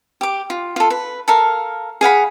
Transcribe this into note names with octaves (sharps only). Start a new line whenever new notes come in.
G4 D6
F4
F4 A4
B4
A4 A#4 F5
G#4 F5 F#5 B5